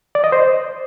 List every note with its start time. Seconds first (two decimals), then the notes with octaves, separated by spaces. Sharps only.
0.15 D5
0.24 D#5
0.32 C5